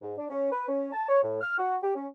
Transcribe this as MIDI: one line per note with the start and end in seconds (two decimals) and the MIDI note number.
0.02 0.12 44
0.17 0.25 62
0.30 0.49 61
0.52 0.65 71
0.68 0.92 61
0.92 1.08 81
1.09 1.21 73
1.23 1.41 45
1.41 1.56 89
1.58 1.76 66
1.83 1.94 67
1.95 2.07 61